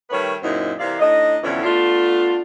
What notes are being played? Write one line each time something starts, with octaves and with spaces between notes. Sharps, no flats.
D#3 G3 A3 B4 C#5
F#2 A#2 F#3 C4 D#4 E4
C3 E3 A#4 D5 F5
A2 D4 D#4 D#5
F2 B2 D3 E3 C#4 E4
A3 B3 D4 F4